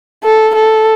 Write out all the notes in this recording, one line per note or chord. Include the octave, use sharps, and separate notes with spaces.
A4
A4